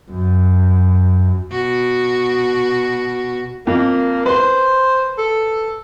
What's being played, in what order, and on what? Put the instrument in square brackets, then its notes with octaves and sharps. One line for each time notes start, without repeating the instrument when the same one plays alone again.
[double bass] F#2
[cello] B2 F#4
[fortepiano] F2 [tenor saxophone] A#3
[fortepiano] B4 C6 [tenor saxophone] C5
[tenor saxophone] A4